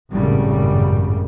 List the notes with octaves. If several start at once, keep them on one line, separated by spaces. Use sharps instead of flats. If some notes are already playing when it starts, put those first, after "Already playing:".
G#1 F#2 A2 C#3 G3